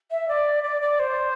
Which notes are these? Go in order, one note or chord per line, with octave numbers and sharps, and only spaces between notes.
E5
D5
D5
D5
C5